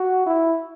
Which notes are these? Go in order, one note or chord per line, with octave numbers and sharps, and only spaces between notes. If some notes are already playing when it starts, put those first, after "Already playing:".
Already playing: F#4
E4